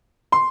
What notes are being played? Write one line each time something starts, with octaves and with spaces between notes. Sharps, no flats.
C6